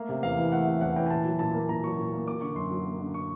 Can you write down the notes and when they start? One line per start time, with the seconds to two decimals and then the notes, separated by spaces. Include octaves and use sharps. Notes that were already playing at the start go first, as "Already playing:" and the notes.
Already playing: A3 A#3 F5
0.09 C3
0.23 E2 F5
0.38 E3
0.52 A3 F#5
0.67 C3
0.81 E2 F#5
0.96 E3 G5
1.06 G#5
1.10 A#2 A5
1.25 F#3
1.39 A#2 A5
1.55 A#3
1.69 A#2 A#5
1.83 F#3 C#6
1.98 A#2
2.13 A#3
2.27 A#3 D6
2.41 D3 C#6
2.56 F#2 C6
2.71 F#3
2.85 A#3
3.00 D3
3.14 C#6